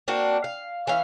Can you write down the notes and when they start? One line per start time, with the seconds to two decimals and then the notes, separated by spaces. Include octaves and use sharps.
0.08 A#3 C4 D4 F#4
0.44 F5
0.87 E3 C#4 F5